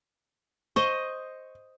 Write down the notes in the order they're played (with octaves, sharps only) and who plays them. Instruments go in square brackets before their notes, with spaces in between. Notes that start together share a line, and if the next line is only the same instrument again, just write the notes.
[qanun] C5 D#5 [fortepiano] C#6